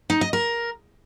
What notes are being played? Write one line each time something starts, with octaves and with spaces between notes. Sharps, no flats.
D#4
D#5
A#4